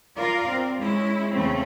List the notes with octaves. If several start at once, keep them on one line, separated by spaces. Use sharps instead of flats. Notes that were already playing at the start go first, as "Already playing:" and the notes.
F4 A#4 D5 F5
C4
G#3 C#4 E4
E2 C#3 A3 C4 C#4